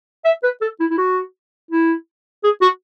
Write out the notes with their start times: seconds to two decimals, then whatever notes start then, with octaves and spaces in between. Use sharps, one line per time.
0.25 E5
0.43 B4
0.62 A4
0.80 E4
0.91 E4
0.98 F#4
1.71 E4
2.44 G#4
2.62 F#4